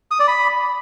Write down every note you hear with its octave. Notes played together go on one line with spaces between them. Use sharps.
D#6
D5
B5